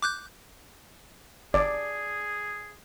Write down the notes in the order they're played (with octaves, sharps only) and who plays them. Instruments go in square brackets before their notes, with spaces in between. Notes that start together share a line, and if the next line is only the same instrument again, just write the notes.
[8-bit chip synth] D6 F#6 G6
[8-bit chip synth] G1 [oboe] G#4 [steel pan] D5